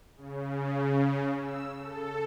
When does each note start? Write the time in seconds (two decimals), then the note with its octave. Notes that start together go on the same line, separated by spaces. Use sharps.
0.16 C#3
1.38 E6
1.78 A4